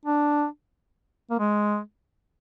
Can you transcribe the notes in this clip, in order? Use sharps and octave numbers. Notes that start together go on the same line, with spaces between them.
D4
A#3
G#3